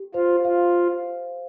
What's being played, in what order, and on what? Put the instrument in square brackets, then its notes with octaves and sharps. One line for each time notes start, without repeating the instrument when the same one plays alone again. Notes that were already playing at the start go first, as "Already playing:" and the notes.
Already playing: [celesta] G4
[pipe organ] F4 [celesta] C5
[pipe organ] F4 [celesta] F5